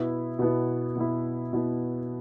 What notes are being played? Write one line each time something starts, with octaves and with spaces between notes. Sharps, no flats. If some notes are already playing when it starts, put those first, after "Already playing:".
Already playing: B2 B3 E4
B2 B3 E4
B2 B3 E4
B2 B3 E4